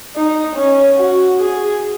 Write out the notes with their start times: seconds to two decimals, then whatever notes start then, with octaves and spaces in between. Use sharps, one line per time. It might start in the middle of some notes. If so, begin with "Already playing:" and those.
0.16 D#4
0.56 C#4
0.98 F#4
1.39 G#4